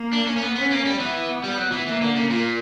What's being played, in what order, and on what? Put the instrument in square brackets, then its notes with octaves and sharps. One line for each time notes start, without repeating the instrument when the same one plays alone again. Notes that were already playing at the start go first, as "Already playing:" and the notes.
Already playing: [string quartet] A#3
[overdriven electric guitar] D4
C#4
C#4
B3
[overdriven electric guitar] B3 [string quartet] C#4
[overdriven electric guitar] A#3
G3
[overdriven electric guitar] E3 [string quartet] B3
[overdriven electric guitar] G3
F#3
E3
[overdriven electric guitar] E3 [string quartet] A#3
[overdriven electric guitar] D3
C#3
A#2